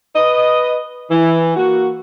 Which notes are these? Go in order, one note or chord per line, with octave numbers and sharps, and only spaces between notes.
B4 D#5
E3
A#3 F#4